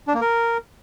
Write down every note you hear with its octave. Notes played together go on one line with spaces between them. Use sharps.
D4
A#3
A#4